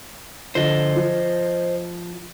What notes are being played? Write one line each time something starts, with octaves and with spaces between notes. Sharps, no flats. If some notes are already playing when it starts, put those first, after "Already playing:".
D3 F3 C5 D#5
F3